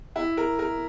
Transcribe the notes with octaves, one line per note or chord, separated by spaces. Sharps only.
E4
A#4
A#4